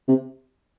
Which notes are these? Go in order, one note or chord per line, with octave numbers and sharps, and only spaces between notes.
C3